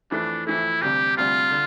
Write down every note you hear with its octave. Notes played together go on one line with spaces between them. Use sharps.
F2 E3 A3 D4
F2 E3 A3 E4
D2 C3 G3 G4
D2 C3 G3 F4
D3